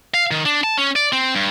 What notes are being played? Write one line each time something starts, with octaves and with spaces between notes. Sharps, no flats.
F5
D#3
D4
A5
C#4
D5
C4
G2